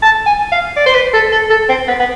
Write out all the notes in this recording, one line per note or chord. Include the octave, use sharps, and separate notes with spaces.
A5
G#5
F5
D5
C5
B4
A4
A4
A4
C4
B3
B3